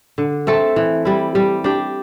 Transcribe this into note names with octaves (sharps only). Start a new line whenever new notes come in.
D3
A3 C4 A4
E3
G3 E4
G3
D4 G4